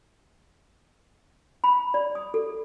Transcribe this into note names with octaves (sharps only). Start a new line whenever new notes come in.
B5
D5
D#6
A4